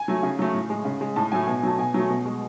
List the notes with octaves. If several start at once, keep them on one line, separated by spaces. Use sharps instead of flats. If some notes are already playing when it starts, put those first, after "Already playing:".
Already playing: G#5
F#3 A3
C#3
F#3 A3
A2
G#3
C#3
G#3
A2 A5
F#3 A3 G#5
B2 G#5
F#3 A3 A5
B2 G#5
F#3 A3
B2
G#3